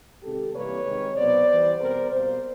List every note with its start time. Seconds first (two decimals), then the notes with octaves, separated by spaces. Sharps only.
0.22 C3 D#3 G#3 G4 A4
0.53 C3 E3 G3 A#3 B4 C#5
0.85 C3 D#3 G#3
1.16 B2 F#3 B3 C5 D5
1.48 E3 G3 B3
1.79 B2 G3 C4 A#4 C5
2.10 B2 G3 A#3 A#4 C5